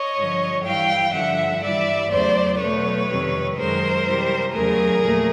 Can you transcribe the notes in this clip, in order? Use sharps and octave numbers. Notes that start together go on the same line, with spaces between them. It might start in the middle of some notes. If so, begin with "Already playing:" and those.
Already playing: C#5 D#5
G2 D3 F3
G2 E3 G3 F5 G5
G2 D3 F3 E5 F#5
G2 E3 G3 D5 E5
E2 C#3 F#3 A3 C5 D5
B2 F#3 A3 B4 C#5
F2 C3 D#3 G3
F#2 D#3 G#3 A#4 C5
C3 E3 G3
E2 C#3 F#3 A3 G#4 A#4
A#2 F3 A3